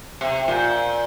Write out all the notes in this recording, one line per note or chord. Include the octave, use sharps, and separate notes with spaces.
C3
A#2